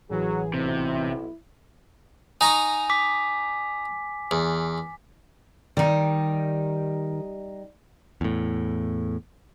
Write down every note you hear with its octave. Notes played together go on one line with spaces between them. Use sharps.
A1 E3 F#3 G#4
B1 C3 E4
D#4 G#5 A#5 C#6
D6 B6
E2
D#3 G3 D#4
E2 A2